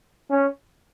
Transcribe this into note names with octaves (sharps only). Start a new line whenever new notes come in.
C#4